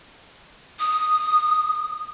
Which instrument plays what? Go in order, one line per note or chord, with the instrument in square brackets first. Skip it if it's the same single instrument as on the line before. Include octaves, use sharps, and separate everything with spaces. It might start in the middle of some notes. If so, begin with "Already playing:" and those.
[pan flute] D#6